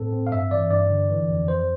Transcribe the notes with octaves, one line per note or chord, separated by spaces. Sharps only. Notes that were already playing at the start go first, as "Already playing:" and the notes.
Already playing: A2 C4 A4
C4
F5
G2 E5
E3 D5
G2 D5
D3
E3
F2
F2 C5